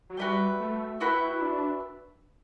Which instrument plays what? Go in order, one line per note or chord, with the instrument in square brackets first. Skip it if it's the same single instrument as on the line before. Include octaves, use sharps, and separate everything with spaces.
[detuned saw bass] F#3
[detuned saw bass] G3 [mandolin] F#4 B4 E5 G5
[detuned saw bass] A3
[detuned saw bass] E4 [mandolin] F#4 B4 E5 G5
[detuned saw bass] E4
D4